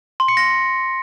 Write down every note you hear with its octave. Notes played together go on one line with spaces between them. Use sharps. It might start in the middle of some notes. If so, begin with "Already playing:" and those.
C6
C#7
A#6